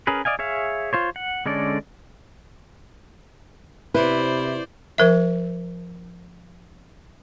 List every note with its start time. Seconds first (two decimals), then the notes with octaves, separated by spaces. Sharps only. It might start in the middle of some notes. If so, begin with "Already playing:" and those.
0.07 C#4 G#4 A#4 B4
0.25 D5 D#5 F5 G#5
0.39 G#4 C#5 E5 F5
0.93 F4 C5 C#5
1.16 F#5
1.46 D3 G#3 C#4 A4 D5
3.94 C3 E4 B4 C5 D5
4.98 F3 A#4 E5